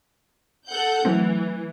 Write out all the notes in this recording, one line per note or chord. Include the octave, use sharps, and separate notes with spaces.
A4 F#5 G6
E3 F#3 A3 C4